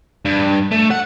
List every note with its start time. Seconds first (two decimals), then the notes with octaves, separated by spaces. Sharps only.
0.25 G2
0.71 A3
0.91 F#5